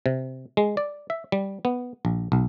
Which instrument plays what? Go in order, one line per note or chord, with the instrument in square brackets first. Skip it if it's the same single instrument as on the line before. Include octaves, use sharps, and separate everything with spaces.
[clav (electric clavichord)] C3
G#3
D5
E5
G3
B3
A#1
B1